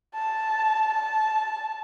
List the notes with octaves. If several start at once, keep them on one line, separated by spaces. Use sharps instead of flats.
A5
A5